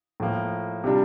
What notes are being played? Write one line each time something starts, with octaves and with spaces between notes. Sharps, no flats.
A2 F3 A#3
C3 G3 D4 F4